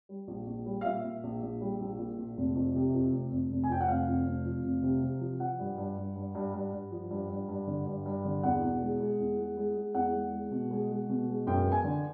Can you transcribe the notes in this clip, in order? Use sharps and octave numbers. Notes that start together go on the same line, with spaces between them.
G3
A#1
A#1
G3
F5
A#2 E5
A#2
A#1
A#1
G3
A#1
A#2
A#1
F1
F2
C3
F2
F1
F1
F1
G#5
F2 G5
F#5
F1 F5
F2
F1
F3
F1
C3
C3
F3
F3 F#5
G2
G2
G2
G2
G2
G2
G2
F3
G2
G2
G2
D3
G2
G2
D3
E2 F#5
B2
G#3
G#3
E2
G#3
G#3
G#3
E2 F#5
G#3
G#3
B2
G#3
G#3
B2
G#3
F#2 G5
B3
G#5
D3